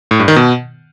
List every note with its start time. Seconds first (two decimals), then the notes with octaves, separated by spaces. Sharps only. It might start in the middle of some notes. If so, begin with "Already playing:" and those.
0.11 A2
0.19 G2
0.28 D#3
0.36 B2